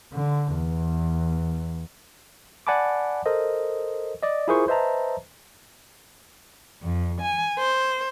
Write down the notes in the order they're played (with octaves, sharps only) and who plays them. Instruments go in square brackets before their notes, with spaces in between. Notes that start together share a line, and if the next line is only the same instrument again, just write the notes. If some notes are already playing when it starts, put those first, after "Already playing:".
[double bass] D3
E2
[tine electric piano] D5 F#5 G#5 A5 B5 D6
A4 A#4 C5 D#5
D5 D#5
E4 F4 G#4 A#4 C5 C#6
B4 C5 D#5 E5 A5 A#5
[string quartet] F2
G#5
C5